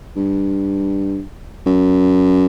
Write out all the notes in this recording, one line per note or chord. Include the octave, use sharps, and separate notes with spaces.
G2
F#2